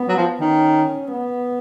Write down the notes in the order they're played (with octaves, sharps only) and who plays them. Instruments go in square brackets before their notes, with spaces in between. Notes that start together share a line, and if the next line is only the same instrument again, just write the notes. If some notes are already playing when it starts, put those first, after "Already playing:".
Already playing: [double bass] B3
[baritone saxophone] F#3
F3
[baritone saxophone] D#3 [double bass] C#4
[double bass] B3